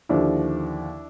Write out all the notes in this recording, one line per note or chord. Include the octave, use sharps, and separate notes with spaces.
D#2 D3 F3 D4 E4